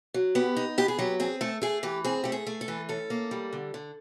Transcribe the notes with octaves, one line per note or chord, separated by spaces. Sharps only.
F#3
B3 G4
D#4
B3 G4
G#4
F#3 G4
C4 G#4
A3 A4
A3 G#4
E3 G4
C4 G#4
A3 G4
G#4
A3
A4
E3
C#4 A4
A#3
G3
D3
D3